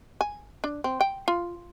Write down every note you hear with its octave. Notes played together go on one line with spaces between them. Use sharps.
G#5
D4
C4
G5
F4